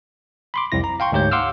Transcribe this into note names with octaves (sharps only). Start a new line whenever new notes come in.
B5 C6 D6
C2 F2 E4 A#6
A#5
F5 G5 C6 C#6
D2 G#2 G4 C#5 G6
F5 F#5 C6 D6 E6 F6